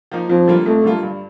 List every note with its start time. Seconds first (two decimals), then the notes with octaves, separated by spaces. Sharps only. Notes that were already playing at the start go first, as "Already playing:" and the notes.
0.12 F3 A#3 D#4
0.29 F2 F3
0.48 D3 G3 A#3 F4
0.66 F2 A3
0.84 D3 G3 A#3 F4
1.03 G2